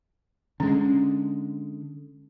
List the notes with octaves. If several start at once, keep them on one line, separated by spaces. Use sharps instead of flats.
D3 G#3 C#4